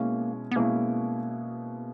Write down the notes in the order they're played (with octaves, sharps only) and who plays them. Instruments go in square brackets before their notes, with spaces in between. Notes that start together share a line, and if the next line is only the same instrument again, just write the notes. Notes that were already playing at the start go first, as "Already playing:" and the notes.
Already playing: [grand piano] B2 G#3 C#4 E4 [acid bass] A#3
[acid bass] B3
[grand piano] B2 G#3 C#4 E4 [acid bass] A#3